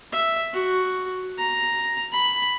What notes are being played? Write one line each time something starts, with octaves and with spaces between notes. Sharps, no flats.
E5
F#4
A#5
B5